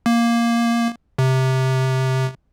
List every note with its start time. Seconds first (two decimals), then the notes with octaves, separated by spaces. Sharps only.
0.06 A#3
1.18 C3